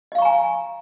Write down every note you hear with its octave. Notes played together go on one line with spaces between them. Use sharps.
D#5 F5 G#5 A#5 C#6